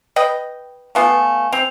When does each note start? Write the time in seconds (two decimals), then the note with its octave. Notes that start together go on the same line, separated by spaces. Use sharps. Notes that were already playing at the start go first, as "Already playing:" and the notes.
0.16 B4 D#5 G5
0.95 A3 B3 F4 F5 G#5
1.53 C4 F7